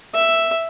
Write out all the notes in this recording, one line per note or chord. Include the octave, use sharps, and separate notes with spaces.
E5